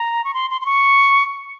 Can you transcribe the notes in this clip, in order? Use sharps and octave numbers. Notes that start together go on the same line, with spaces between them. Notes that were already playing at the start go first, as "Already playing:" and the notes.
Already playing: A#5
C#6
C6
C6
C6
C#6